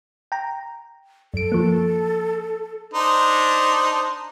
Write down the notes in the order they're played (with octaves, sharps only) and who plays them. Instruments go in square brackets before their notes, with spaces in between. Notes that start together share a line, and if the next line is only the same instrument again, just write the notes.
[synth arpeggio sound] G5 A#5
[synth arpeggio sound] F#2 D7 [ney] A4
[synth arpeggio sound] F3 A#3
[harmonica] D4 D#4 C5